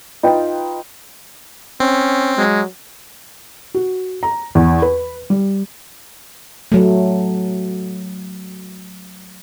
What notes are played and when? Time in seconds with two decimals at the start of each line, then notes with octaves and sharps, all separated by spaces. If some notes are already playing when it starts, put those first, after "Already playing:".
0.23 D#4 F4 B4 G5
1.80 C4 C#4
2.38 F#3 G#3
3.74 F#4
4.23 A#5
4.55 E2
4.82 B4
5.30 G3
6.72 F#3 A3